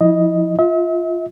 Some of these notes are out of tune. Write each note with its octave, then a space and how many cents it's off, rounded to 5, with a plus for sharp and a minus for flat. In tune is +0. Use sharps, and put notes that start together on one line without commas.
F3 +0 E4 -25 D#5 +5
F4 +0 E5 -45